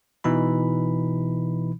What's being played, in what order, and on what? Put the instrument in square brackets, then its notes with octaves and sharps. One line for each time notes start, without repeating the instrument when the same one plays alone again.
[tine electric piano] B2 E3 D#4 B5